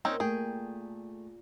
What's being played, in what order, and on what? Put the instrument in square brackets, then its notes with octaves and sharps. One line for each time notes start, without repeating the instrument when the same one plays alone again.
[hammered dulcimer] A#2 [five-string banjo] C4 C#4 D#4
[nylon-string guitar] A3 G5 [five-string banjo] G#4